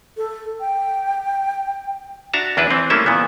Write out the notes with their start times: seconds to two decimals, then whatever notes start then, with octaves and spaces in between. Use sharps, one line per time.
0.17 A4
0.60 G5
2.34 D4 F#4 E5 A5 A#5
2.57 E2 D4 E4 B4
2.71 E3 C4
2.90 G3 A3 A#3 C#4 E4 E5
3.06 A#2 E3 B3